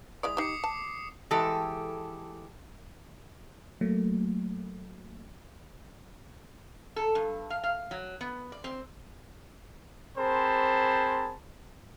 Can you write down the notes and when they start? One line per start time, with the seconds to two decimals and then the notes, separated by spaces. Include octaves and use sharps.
0.23 G#3 E4 D5 D#6
0.37 D#4 G4 D6 C7 C#7
0.64 A5
1.31 E3 G#3 G4 A4
3.81 F#3 A3 A#3
6.96 A4
7.15 G2
7.50 F5
7.64 F5
7.91 F#3
8.21 B3
8.52 D5
8.64 C4
10.17 C4 G#4 A#4 C5 A5 B5